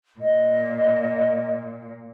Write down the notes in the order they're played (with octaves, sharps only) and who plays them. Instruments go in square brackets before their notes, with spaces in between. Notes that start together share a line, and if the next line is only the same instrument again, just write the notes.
[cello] A#2 [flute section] D#5